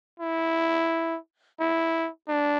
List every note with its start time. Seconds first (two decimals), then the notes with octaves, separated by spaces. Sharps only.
0.20 E4
1.60 E4
2.29 D4